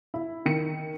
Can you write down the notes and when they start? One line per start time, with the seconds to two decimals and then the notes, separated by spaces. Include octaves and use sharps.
0.14 E4
0.46 D#3 C#7